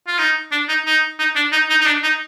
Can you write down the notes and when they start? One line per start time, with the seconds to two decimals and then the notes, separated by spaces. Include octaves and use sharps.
0.08 F4
0.19 D#4
0.52 D4
0.69 D#4
0.86 D#4
1.19 D#4
1.36 D4
1.52 D#4
1.70 D#4
1.81 D#4
1.87 D4
2.03 D#4